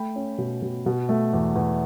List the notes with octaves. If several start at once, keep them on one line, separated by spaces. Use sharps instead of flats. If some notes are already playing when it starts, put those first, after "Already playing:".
Already playing: A3 G5 B5
C#4
B2
B2
B2
A3
E2
E2